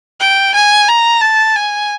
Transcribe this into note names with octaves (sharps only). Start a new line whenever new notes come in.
G5
G#5
A#5
A5
G#5